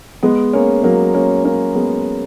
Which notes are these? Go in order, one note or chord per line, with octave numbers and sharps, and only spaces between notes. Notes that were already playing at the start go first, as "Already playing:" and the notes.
G#3 B3
A#3 C#4
F#3 A#3
A#3 C#4
A#3 C#4
G#3 B3